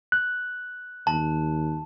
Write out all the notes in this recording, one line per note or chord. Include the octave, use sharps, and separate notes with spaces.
F#6
D#2 A5